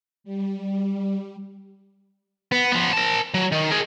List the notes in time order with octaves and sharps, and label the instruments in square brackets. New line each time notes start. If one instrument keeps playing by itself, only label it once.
[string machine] G3
[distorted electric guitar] B3
F3 B3
A#4 A5
F#3
D#3
G#4 A#4